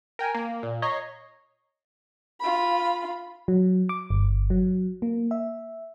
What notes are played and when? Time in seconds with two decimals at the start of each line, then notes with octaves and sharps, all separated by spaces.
0.19 A#4 G5 G#5
0.35 A#3
0.63 A#2
0.82 C#5 D#5 A#5 C#6 B6 C7
2.41 F4 B5
3.48 F#3
3.89 D6
4.10 G1
4.50 F#3
5.02 A#3
5.31 E5